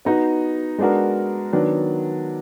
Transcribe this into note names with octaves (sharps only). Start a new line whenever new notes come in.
B3 D#4 F#4
G#3 B3 D4 F#4 A#4
D#3 F#3 B3 D4